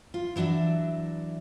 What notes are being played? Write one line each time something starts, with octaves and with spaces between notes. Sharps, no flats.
F4
E3 F#3 D4 D5 E5